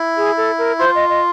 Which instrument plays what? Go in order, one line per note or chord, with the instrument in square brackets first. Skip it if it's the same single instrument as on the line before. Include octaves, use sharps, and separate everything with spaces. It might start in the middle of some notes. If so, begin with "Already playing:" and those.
Already playing: [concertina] E4
[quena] G#4
A4
A#4
[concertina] F4 [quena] C5
[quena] D#5
D#5